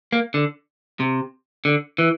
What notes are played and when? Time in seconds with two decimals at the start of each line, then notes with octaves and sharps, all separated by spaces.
0.12 A#3
0.34 D3
1.00 C3
1.65 D3
1.98 E3